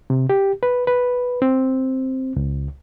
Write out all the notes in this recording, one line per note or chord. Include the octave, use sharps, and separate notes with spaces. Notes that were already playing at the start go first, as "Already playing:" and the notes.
C3
G4
B4
B4
C4
C#2